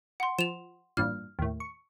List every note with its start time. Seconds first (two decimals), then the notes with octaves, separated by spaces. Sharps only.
0.20 F#5 C6
0.39 F3 E7 F7
0.97 A1 G2 A#2 F6
1.39 D#2 A2
1.60 C#6